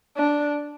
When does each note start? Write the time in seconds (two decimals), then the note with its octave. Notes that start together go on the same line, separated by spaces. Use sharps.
0.17 D4